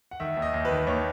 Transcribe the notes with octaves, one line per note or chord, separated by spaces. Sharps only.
F#5
D#3 E5
D#2
D#5
D#2
B4
D#3
D#2 C#5